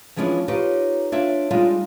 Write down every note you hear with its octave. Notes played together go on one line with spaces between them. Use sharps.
E3 F3 G#3 C#4 D4 E4
D#4 F4 G4 B4 C#5
D4 F4 C#5 E5
G3 G#3 D4 D#4 F4